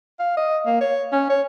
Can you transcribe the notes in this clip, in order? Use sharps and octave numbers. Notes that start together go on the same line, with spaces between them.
F5
D#5
A#3
C#5
C#4
C#5